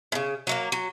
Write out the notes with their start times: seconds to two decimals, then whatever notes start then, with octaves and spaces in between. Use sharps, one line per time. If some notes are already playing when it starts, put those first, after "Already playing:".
0.12 A2 C#3
0.47 F#3 A3 A#3
0.72 F#3